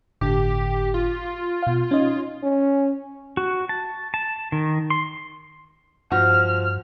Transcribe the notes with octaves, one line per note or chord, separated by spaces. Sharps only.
G1 A2 D3 G4
F4
B2 F5
C#4 D#4 D#5
C#4
F#4
A5
A5
D#3
C6
G2 F3 F#4 F6